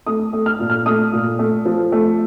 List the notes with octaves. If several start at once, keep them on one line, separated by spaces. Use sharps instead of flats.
A3 D#6
A3
F6
A#2
F6
A3 D#6
A#2
A3
F3
A3